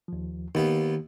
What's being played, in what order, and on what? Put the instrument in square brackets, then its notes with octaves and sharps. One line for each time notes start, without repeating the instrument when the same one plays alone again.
[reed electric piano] D#2 F3
[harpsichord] D#2 B3 [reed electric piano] D#3